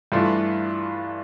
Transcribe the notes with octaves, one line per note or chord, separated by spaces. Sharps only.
G2 E3 A3 D4 F4